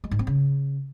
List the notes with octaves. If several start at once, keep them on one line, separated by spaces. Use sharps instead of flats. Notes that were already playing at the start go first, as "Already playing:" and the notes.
G#3
G#2
C4
C#3